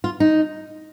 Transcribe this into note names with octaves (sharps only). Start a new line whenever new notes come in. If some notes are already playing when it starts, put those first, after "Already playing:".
F4
D#4